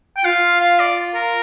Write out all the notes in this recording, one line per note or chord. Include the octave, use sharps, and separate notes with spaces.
G5
F4 F5
F5
D5
A#4